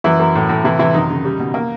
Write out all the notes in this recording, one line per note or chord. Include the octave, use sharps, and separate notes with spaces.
F#2 E3 E4
F#2
A2
A2
C3 E3 E4
C3 E3 E4
F#2 D#3 D#4
C#3
G3
B2
A#3